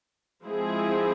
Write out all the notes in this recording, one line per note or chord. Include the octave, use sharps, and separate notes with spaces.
F3 G#3 C4 E4 G#4